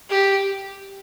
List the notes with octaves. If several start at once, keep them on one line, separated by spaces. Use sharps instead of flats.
G4